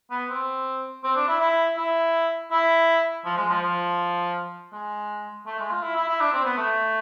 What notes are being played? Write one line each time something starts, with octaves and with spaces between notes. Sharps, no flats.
B3
C4
C4
D4
E4
E4
E4
E4
F3
G#3
F3
F3
G#3
A3
G#3
F4
E4
E4
E4
D4
C4
B3
A3